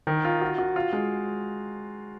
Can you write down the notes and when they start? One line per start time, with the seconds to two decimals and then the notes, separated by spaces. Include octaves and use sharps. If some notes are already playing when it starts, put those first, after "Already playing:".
0.07 D#3
0.25 F4
0.41 F#4
0.58 F#4
0.76 F4
0.93 G#3